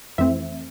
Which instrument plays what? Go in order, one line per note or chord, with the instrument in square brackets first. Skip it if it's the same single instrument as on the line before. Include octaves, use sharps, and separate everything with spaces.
[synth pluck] F2 E3 A3 C4 E5